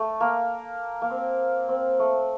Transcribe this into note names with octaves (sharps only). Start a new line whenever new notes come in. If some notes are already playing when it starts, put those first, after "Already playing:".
Already playing: A3
A#3
A#3
C4
C4
A3